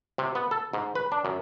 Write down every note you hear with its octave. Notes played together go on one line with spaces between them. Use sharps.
C3
B3
A4
G#2
B4
D4
F#2